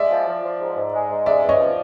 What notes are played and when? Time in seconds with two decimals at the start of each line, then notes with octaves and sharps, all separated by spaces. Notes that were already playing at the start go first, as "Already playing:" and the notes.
Already playing: G#3 D5 E5
0.11 F3
0.27 F3
0.43 F3
0.60 G#2
0.77 G#2
0.93 G#3
1.11 G#2
1.26 G#3 D5 E5
1.43 E2
1.49 C#5 D#5
1.60 F3